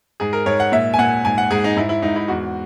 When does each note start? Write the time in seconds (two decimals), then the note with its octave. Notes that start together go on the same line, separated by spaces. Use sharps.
0.20 G#2 G#4
0.33 A#4
0.46 G#2 C#5
0.60 F#5
0.72 A#2 E5
0.94 G#5
0.98 A#2 F#5
1.25 G#2 G#5
1.38 F#5
1.51 G#2 G#4
1.64 D#4
1.77 G#2 E4
1.89 E4
2.02 G#2 D#4
2.16 E4
2.28 E2 F#4